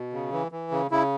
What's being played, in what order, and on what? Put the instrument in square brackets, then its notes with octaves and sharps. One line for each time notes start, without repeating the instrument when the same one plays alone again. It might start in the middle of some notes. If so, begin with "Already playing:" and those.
Already playing: [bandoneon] B2
C#3
E3
E3
C#3
C#3 E4